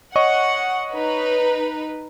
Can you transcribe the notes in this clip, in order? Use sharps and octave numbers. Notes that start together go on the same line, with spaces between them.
C#5 D#5 F#5 C#6
D#4 B4